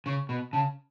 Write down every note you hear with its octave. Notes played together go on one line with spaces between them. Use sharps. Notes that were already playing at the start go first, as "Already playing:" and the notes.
C#3 C#6
B2 B5
C#3 A5